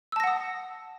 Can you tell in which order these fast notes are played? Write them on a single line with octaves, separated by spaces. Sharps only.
E6 A5 A#6 F#5 D#6